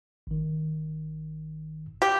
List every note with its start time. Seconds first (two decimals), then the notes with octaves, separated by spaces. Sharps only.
0.27 G#1 D#3
2.02 G4